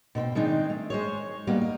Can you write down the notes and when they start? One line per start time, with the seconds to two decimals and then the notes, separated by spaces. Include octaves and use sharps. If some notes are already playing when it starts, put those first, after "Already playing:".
0.15 B2 C4 C#5 G5
0.35 D#3 G#3 C4 D4 D#4
0.70 A3
0.90 G#3 C5 C#5
1.47 G3 A#3 B3 D#4
1.62 D#5